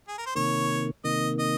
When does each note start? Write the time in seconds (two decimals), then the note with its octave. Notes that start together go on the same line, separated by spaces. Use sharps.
0.08 G#4
0.18 A#4
0.26 C5
0.35 C3 D#3 A#3 C#5
1.04 C3 D#3 A#3 D#5
1.39 D#5